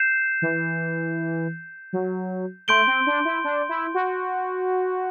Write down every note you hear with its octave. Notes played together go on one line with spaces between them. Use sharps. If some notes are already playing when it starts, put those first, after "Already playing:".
Already playing: G6 C7 E7
E3
F#3
A3 C6 G6 D7 G7
C4
D4
E4
D4
E4
F#4